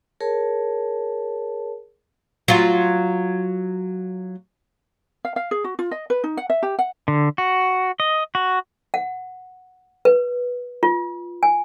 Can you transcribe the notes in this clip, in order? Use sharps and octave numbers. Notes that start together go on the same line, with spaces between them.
G#4 A#4 C#5 A5
F#3 F4
F5
F5
G#4
F#4
F4
D#5
B4
D#4
F#5
E5
G4
F#5
D3
F#4
D#5
F#4
F#5
B4
F4
G#5